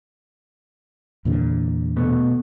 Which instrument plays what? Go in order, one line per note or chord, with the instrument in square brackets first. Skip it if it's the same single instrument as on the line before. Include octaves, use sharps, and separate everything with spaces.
[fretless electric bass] E2 A#2 D3
[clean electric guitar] B2 A3 B3